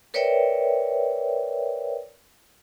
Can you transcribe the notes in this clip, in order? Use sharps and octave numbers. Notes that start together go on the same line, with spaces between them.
A#4 B4 C#5 D5 E5 G5